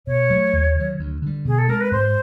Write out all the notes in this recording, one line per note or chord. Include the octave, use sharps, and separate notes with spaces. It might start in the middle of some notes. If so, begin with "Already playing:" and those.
B2 C#5
F#3 A3
D#2
D#3 F#3
D2
D3 G3
B2 G#4
A4
G#3 C4 A#4
B4
G#2 C5